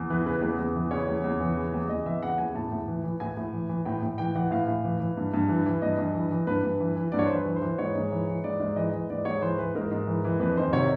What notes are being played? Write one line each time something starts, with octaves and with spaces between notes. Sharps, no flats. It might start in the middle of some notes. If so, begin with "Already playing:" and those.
Already playing: E2
E3 B4
C#3 B4
E2 B4
E2
E3
C#3 C#5
E2
E2
E3
C#3
E2
E2 D#5
E3 E5
C#3 F#5
E2 G#5
A2 A5
A2
E3
E3
A2 G#5
A2
E3
E3
A2 G5
A2
E3 G5
E3 F#5
A2 F5
A2
E3
E3
G2
G2
E3
E3
G2 D#5
G2
E3
E3
G2 B4
G2
E3
E3
G2 D5
C#5
C5
G2
B4
E3
C5
E3
G#2 C#5
G#2
E3
E3
G#2 D5
G#2
E3 D#5
E3
G#2 D5
G#2 C#5
E3 C5
E3 B4
G#2 A#4
G#2
E3
E3
F2 B4
D#3 C5
C3 C#5